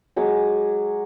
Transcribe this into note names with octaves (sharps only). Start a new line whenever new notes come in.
F#3 G#3 G#5 D6